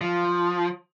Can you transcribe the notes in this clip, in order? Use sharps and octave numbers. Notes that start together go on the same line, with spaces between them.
F3